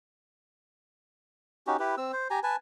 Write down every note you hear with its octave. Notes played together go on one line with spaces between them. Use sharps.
C#4 D#4 F#4 G4
E4 G4 B4
C4 E6
C5
G4 G#5 A#5
B4 G#5 A5